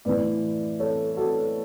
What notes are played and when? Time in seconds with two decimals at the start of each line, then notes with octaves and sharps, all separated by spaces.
0.05 A2 E3 B4 D5
0.79 A4 C#5
1.17 F#4 A4